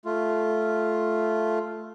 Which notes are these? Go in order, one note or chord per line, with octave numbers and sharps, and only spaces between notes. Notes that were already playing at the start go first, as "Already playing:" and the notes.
A3 F4